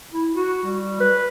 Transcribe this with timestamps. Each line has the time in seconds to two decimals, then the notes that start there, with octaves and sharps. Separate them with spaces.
0.13 E4
0.35 F#4
0.64 G3
1.00 B4